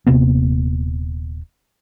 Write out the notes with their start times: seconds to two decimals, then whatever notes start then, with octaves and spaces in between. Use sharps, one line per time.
0.07 D#1 C3 A#3 B3